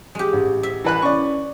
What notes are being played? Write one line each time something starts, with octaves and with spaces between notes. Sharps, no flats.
G#3 G4
A1
E5
E3 B4 F#6
C#4 D5 C#6